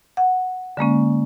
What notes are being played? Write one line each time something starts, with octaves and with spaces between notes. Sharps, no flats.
F#5
D3 G#3 A#3 C#4